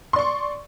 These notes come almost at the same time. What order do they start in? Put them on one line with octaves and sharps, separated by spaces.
C6 D5 C#6